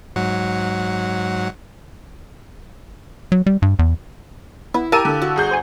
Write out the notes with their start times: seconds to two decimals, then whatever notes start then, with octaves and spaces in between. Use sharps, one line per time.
0.16 G#2 F#3 F#5
3.32 F#3
3.46 G3
3.62 G2
3.79 E2
4.74 B3 E4 B4
4.92 G4 A#4 F5 A5 E6 D#7
5.05 D3
5.22 F#4
5.36 G1 G#4 G6
5.49 A4 C5 G#5